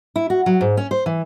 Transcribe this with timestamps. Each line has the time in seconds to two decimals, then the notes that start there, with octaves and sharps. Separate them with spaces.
0.16 E4
0.30 F#4
0.46 F#3
0.61 G#2
0.77 C#4
0.91 C5
1.06 E3